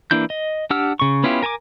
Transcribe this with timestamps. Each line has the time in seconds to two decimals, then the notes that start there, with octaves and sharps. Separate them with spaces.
0.11 E3 A#3 D4 E4 G6
0.30 D#5
0.70 D4 G4 F#5 E6 F6
1.00 C#3 C#6
1.23 B3 C#4 E4 F4 G4
1.42 A#4 G#5 A5 D6